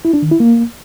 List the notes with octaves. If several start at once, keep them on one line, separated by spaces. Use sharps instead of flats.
E4
D4
D#3
E4
A#3